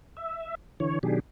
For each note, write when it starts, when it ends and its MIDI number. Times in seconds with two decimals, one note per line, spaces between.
0.17 0.55 76
0.80 0.99 50
0.80 0.99 52
0.80 0.99 73
1.03 1.20 47
1.03 1.20 51
1.03 1.20 54
1.03 1.20 62
1.03 1.20 67
1.03 1.20 68